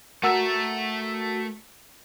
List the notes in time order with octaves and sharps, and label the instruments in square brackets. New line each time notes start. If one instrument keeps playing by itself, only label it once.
[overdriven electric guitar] A3 E5 [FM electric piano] F#4 A#4 E6